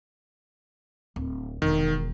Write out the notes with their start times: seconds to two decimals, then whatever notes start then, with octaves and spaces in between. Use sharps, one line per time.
1.16 D1
1.62 E1 D#3